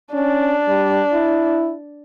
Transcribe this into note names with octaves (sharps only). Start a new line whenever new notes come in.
C#4 D4
G3
E4